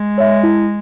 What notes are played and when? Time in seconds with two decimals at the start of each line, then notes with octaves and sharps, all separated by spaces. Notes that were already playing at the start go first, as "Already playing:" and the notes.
Already playing: G#3
0.18 C#5 E5
0.43 E4